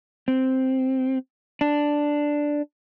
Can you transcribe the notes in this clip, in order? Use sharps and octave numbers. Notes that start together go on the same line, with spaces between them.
C4
D4